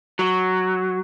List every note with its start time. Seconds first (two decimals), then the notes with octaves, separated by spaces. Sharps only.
0.19 F#3